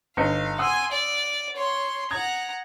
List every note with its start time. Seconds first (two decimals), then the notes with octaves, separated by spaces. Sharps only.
0.17 G1 D#4 F5 C#7
0.58 F#5 G#5 C6 D#6 E6
0.91 D5
1.56 C#5 C6
2.11 F#5 A#5 D#6 G#6